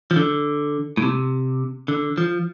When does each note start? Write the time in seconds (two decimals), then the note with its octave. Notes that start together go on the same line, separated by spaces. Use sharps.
0.11 F3
0.16 D3
0.97 A2
1.02 C3
1.88 D3
2.18 F3